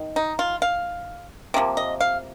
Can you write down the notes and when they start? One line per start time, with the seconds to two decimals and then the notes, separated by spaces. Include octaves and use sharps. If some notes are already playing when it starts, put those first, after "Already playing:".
Already playing: D#3
0.16 D#4
0.39 F4
0.62 F5
1.54 C3 F3 A#3
1.77 D#5
2.00 F5